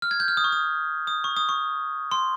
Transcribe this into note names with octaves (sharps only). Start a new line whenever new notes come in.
F6
G#6
G6
F6
D#6
C#6
D#6
D#6
C#6
D#6
C#6
C6